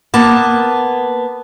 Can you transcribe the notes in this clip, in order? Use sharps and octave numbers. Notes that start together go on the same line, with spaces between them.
A#3 B3 A5